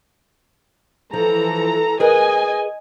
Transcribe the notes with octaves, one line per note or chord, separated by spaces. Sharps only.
E3 F3 A4 A#5
G#4 A#4 B4 D#5 G#5